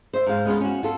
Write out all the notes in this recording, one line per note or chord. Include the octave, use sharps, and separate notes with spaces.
C5 E5
G#2 F5
G#3 B3 C#4 F4
C#4 F#4
F4 A4